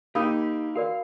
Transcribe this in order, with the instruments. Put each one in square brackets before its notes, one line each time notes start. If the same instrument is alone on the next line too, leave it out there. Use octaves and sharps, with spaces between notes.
[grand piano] A#3 [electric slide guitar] D#4 G4 [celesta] B5 D#6 E6
[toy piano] F#4 A#4 D5 [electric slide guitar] F5